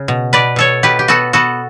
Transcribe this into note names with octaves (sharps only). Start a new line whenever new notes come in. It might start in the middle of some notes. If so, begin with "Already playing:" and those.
Already playing: C#3
B2
B2 B4 D5
B2 A4 C#5
B2 G4 B4
G4
B3 F#4 A4
B3 F#4 A4